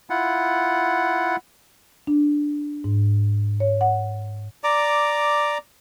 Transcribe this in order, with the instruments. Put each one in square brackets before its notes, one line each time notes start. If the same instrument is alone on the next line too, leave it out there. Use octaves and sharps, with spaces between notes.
[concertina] E4 F4 F#5
[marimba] D4
G#2
C#5
F#5
[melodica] D5 A#5 D6